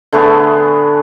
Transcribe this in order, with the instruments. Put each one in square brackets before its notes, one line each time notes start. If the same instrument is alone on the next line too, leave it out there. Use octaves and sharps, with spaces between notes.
[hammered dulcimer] D3 A3 B3 G#4